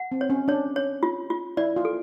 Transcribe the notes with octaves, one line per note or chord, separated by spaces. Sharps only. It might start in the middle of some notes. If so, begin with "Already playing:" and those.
Already playing: F#5
C4
C#5
C#4
D4 C#5
C#5
F4
F4
E4 D5
F4
A4